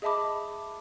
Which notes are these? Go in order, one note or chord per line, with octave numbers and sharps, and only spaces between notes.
G#4 D#5 E5 A5 B5 D6